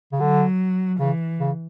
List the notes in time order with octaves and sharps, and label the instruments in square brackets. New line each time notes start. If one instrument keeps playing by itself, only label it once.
[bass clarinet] C#3
[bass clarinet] D3 [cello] F#3
[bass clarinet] C#3 [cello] E3
[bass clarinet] C#3